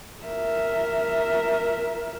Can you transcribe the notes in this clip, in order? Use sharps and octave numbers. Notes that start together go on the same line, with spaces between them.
A#4 E5